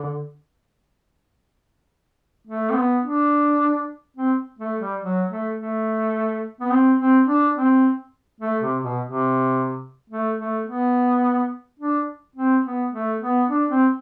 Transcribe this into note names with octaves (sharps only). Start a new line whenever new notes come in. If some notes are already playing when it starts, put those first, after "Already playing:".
Already playing: D3
A3
C4
B3
D4
C4
A3
G3
F#3
A3
A3
B3
C4
C4
D4
C4
A3
C3
B2
C3
A3
A3
B3
D4
C4
B3
A3
B3
D4
C4